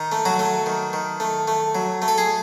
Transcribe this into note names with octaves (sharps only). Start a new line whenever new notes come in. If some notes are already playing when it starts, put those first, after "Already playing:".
Already playing: D#3 D#4
A3
F#3 F#4
A3
D#3
D#3
A3
A3
F#3
A3
A4
G#4